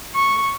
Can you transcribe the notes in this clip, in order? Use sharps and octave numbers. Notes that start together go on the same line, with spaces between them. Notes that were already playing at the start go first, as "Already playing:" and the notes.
C#6